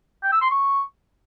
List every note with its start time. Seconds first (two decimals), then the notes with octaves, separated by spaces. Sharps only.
0.23 G5
0.32 E6
0.41 C6
0.50 C#6